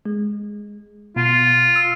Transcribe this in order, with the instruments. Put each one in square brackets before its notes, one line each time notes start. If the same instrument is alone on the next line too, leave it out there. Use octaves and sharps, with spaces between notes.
[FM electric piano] G#3
[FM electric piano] B2 [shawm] F4
[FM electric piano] E6